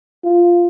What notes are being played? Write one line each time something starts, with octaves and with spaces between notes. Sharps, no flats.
F4